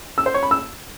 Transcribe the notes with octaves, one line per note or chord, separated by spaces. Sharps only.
E6
C5
C#5
B5
E6